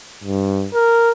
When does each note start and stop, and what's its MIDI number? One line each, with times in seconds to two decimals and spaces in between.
0.24 0.67 43
0.74 1.12 70